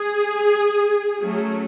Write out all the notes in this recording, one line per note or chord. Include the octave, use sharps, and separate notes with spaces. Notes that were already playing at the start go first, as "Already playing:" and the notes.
Already playing: G#4
F#3 A3 C#4